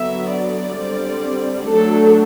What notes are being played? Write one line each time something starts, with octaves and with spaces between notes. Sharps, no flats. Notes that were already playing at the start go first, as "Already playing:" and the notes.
Already playing: D3 F#3 B3 E5
D5
D3 G3 C4
F#3 A3 D4 A4